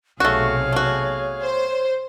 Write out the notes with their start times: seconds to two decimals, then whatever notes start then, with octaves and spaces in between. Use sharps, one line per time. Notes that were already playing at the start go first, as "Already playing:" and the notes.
0.20 B1 C3 A3 F#4 G#4 C#5 F5
0.72 A3 F#4
1.43 C5